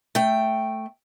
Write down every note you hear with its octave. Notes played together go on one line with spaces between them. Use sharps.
A3 G5